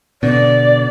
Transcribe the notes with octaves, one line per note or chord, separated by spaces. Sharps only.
B2 D3 D5